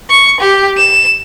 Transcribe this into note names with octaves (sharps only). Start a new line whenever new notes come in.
C#6
G4
E7